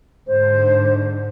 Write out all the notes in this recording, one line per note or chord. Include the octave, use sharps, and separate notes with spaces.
G#2 D3 C5